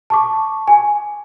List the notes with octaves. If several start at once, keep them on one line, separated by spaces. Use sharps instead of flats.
A5 C#6 D6
G#5